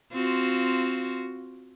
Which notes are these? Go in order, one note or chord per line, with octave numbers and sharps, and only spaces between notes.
C4 F4 F#4